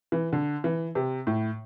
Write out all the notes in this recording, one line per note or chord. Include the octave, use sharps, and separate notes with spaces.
E3
D3
E3
C3
A2